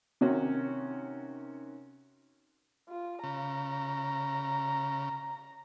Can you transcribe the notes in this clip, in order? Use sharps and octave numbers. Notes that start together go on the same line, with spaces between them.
C3 D#3 C#4 F#4
F4
C#3 A#5